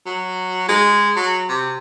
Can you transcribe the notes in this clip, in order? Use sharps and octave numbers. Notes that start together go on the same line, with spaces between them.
F#3
G#3
F#3
C3